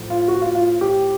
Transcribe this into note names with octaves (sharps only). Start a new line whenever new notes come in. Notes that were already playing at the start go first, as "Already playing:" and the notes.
Already playing: A2 F3 A3
F4
F#4
F4
F4
G4